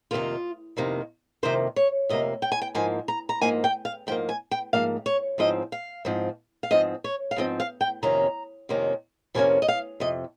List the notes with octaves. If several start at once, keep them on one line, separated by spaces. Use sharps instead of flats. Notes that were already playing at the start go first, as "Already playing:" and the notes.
F2 C3 D#3 A#3 F4
F2 C3 D#3 A#3
F2 C3 D#3 A#3 C5
C#5
F2 C3 A#3 D#5
G5
G#5
G5
G#2 F3 A#3 G#5
A#5
A#5
G#2 F3 A#3 G#5
G5
F5
G#2 F3 A#3 G5
G#5
G5
G#2 F3 A#3 F5
C#5
G#2 F3 C4 D#5
F5
G#2 F3 C4
F5
G#2 F3 C4 D#5
C#5
F5
G#2 F3 C4 D#5
F5
G5
F2 C3 D#3 A#3 C#4 A#5
F2 C3 D#3 A#3 C#4
F2 C3 D#3 A#3 C#4 G#5
D#5
F5
F2 C3 D#5